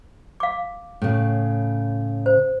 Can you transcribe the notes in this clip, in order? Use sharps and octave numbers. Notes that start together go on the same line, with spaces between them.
F5 D6
A2 C#3
C5